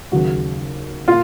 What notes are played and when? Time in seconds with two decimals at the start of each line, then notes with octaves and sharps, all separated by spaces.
0.12 D#2 C#3 F#3 F#4
1.08 A#2 F4